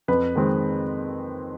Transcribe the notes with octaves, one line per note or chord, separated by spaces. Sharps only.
F2 B4
D#3 G#3 C4